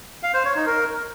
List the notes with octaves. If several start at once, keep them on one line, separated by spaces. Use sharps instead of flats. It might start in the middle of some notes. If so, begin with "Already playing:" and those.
F5
C5
C#5
D#4
A#4